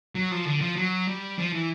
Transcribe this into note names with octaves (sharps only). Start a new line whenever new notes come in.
F#3
F3
D3
F3
F#3
G3
F3
E3